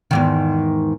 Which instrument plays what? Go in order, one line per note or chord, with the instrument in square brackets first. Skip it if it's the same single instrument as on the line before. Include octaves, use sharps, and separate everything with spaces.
[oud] E2 G#2 D#3